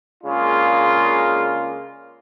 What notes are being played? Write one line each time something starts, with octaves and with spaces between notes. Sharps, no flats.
C#3 G#3 A#3 D4 F4